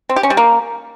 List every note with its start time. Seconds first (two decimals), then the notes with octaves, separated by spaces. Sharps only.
0.09 C4
0.16 G4
0.23 C#4
0.30 G3
0.37 A#3